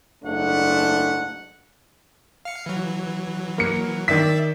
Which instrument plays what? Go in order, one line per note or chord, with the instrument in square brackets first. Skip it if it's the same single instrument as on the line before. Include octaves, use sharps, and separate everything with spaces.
[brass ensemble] F#1 G#2 A3 D4 F#5
[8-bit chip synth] F5 C#7
E3 F#3
[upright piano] A#3 C#7
[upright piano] D#3 B6 [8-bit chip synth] D5 E5 E6